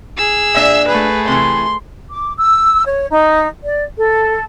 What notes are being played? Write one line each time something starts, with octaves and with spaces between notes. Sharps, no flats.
G#4 E6
A#2 D4 E5
A3 G#4 B4
C3 E3 C6
D6
E6
C#5
D#4
D5
A4